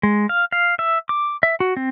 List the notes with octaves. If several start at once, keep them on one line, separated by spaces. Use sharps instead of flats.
G#3
F5
F5
E5
D6
E5
F#4
C4